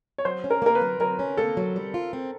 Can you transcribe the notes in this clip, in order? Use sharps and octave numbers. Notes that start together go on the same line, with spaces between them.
C#5
F#3 C5
C#4
A#4
A#3 A#4
B4
F#3
F#3 A#4
C#4
A#3 A4
F#3
G3
F4
C4